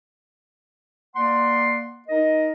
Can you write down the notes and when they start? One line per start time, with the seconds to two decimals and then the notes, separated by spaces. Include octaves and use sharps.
1.16 A#3 D5 F#5 C6
2.08 D#4 A#4 D#5